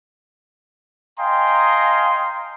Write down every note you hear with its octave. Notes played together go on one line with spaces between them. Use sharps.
D#5 F5 G5 G#5 A#5 C6